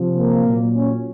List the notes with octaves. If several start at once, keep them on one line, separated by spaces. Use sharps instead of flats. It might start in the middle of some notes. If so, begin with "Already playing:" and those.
Already playing: C3 F3
A#3
A#2 F#3
C#4